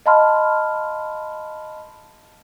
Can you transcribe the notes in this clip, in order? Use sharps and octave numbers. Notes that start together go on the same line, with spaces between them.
D#5 F5 A5 B5 C6 F6